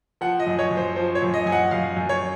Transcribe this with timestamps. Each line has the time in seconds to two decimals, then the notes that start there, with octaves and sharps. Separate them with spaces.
0.21 F3 F#5
0.40 D#5
0.46 F#2
0.59 C#5
0.70 F#2
0.77 C5
0.96 F3 C5
1.15 C#5
1.22 F#2
1.34 D#5
1.46 F#2 G#5
1.52 F#5
1.71 F#2 F5
1.96 F#2
2.09 C#5